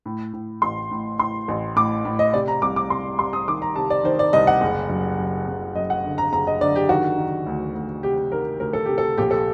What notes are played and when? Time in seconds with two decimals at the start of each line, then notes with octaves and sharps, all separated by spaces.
0.06 A2
0.33 A2
0.62 A1 C6
0.91 A2
1.19 A2 C6
1.48 A1
1.76 A2 D6
2.05 A2
2.19 D#5
2.34 C3 D5
2.48 A#5
2.62 C2 D6
2.76 D6
2.90 C2 C6
3.19 C2 C6
3.33 D#6
3.48 D#3 D6
3.62 A#5
3.76 C3 A5
3.90 D5
4.04 D#3 C5
4.19 D5
4.33 C2 D#5
4.47 F#5
4.61 F#1
4.90 F#2
5.19 F#2
5.47 F#1
5.75 F#2 D#5
5.90 F#5
6.04 D3
6.18 A#5
6.32 F#1 A#5
6.47 D#5
6.61 D3 D5
6.76 G4
6.89 D#3 F#4
7.18 D#3
7.47 D2
7.75 D2
8.03 C3 G4
8.32 D#3 A#4
8.60 D2 A#4
8.73 A4
8.85 C3 G4
8.98 A4
9.18 A#1 G4
9.31 A4